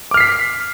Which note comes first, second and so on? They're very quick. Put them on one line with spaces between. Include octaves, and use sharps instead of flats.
D6 F6 C7 B6